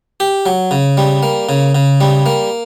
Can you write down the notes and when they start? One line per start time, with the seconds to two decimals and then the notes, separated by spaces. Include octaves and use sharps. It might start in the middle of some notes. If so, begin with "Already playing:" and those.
0.20 G4
0.46 F#3
0.71 C#3
0.97 G3
1.23 A#3
1.49 C#3
1.75 C#3
2.01 G3
2.26 A#3